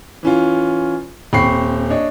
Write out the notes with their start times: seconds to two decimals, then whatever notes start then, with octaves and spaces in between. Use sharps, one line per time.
0.23 E3 C#4 F4
1.33 D#1 C4 G5 B5 C#6 C7
1.90 D4 C#5 D#5